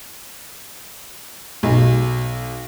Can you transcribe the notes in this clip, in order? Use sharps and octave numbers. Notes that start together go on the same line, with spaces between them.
B1